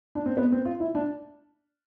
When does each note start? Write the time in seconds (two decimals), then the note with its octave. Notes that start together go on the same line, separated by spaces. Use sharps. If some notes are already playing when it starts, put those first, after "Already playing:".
0.15 D4
0.26 C4
0.37 B3
0.52 C4
0.65 F4
0.80 E4
0.95 D4